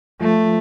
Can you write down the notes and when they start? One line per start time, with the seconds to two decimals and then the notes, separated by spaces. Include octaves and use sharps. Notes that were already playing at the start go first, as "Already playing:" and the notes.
0.21 F3 A3 F4